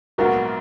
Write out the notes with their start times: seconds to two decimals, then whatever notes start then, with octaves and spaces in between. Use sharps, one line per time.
0.18 A#1 G#2 F#3 B3 F4 F#4 A#4